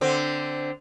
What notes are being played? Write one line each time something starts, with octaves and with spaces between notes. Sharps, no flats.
D3 C4